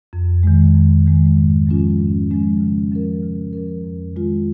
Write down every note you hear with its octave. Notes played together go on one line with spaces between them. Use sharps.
F2
D#3 G#3
F2
D#3 G#3
G#2
F3 G#3 C#4 F4
G#2
F3 G#3 C#4 F4
C#3
F3 C#4 A#4
C#3
F3 C#4 A#4
F2
D#3 G#3 F4